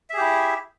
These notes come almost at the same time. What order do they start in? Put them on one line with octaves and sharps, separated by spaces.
E5 G#4 G4 E4